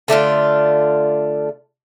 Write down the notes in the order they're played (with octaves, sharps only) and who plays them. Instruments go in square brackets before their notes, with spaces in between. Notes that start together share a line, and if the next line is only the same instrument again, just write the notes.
[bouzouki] D3 A3 D4 F4